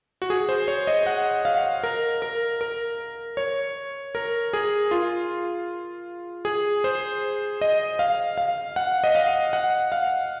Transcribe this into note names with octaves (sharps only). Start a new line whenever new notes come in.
F#4
G#4
C5
C#5
D#5
F#5
F5
A#4
A#4
A#4
C#5
A#4
G#4
F4
G#4
C5
D#5
F5
F5
F#5
D#5
F5
F#5
F5